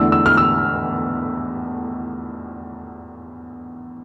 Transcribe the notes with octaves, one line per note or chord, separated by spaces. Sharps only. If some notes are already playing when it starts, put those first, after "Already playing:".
Already playing: E2 D3 A3 E4 E6
E6
F6
E6